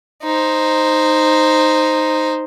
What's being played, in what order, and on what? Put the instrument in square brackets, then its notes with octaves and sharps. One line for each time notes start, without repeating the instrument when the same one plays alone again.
[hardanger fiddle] D#4 C5